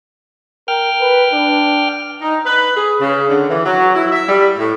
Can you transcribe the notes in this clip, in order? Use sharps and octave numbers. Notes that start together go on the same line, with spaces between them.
A#4 G5 F6
B4
D4
D#4
B4
G#4
C#3
D3
E3
F#3
E4
E5
G3
A2